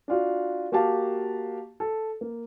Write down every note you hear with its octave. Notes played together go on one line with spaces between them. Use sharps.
D4 F4 F#4
A#3 F#4 G4 F5 A5
A4
A#3